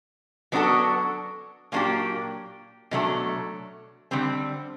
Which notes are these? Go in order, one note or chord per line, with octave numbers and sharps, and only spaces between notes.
F#3 B3 D4 F#4 A4
A#2 F#3 A#3 D4 G4
B2 F#3 A3 D4
D3 G3 C4